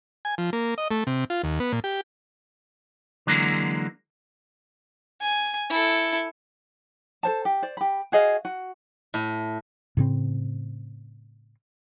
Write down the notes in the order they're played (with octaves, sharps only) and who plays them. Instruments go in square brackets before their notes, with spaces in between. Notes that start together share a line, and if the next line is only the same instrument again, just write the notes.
[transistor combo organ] G#5
F3
A#3
D#5
A3
C3
F4
D#2
B3
A#2
G4
[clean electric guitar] D3 E3 F#3 G#3 A#3
[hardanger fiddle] G#5
E4 A4
[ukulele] A4 C5 A5
G4
C5 D5
G4 B5
F#4 G#4 D#5 F5
F#4
[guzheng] A2
[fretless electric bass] A2 C#3 C4